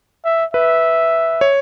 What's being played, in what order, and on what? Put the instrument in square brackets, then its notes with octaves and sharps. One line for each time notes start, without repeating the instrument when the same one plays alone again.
[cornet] E5
[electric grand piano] B4 [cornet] E5
[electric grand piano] C#5